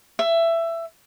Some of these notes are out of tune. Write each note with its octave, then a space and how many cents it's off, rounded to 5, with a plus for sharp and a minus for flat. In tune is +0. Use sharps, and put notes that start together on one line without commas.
E5 +15